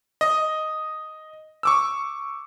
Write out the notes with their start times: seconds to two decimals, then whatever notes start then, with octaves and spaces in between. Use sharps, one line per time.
0.21 D#5
1.63 C#6 D6 E6